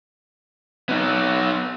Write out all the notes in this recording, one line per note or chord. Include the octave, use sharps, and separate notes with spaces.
B3 D#4